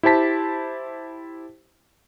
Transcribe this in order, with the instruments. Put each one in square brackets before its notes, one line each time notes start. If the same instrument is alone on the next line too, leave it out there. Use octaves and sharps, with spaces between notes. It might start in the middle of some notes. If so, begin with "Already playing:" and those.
[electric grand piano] E4 G4 C5 A5 B6